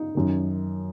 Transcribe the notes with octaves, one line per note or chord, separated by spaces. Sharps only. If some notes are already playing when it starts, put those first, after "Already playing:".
Already playing: D#4
F#2 D#3